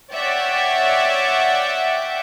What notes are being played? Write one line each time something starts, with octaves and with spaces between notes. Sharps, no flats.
C#5 D5 E5 F#5 G5